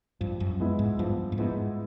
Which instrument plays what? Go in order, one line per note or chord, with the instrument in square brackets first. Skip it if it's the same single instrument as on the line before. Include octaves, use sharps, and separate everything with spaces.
[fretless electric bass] G2 [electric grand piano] F3
[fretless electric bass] F#2
[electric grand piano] G#3 B3 E4
[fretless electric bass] G#2
[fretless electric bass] G2 [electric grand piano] F3
[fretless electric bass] A2
[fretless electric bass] G#2 [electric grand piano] G#3 B3 E4